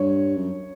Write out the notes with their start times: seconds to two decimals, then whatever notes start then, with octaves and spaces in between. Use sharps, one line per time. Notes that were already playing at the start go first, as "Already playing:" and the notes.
Already playing: G2 C#5
0.36 F#2